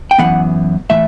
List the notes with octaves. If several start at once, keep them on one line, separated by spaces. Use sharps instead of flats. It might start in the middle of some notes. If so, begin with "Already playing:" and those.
G5
F#2 E3 B3 F#5
A2 E3 A3 E5